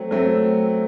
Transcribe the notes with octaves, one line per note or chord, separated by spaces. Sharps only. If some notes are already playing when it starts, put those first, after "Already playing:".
Already playing: F#3 A3 C4
F#3 A3 C4